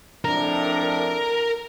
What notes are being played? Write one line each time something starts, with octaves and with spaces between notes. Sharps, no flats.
F2 A2 D4 A#4